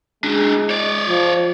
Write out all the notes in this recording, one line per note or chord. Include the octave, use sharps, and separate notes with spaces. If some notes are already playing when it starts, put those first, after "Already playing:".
G#3 D4 E4
C#5 D5
F3